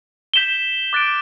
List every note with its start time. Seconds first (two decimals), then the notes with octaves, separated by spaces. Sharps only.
0.34 G6 B6 E7 G7
0.93 D6 F#6 A6 D7